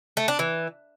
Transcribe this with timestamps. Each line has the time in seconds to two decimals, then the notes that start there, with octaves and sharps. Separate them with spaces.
0.17 A3
0.28 D4
0.39 E3